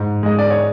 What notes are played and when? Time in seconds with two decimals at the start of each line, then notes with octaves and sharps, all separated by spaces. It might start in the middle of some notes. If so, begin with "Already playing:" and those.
Already playing: G#2
0.23 G#3 D#5
0.39 D5
0.50 C#5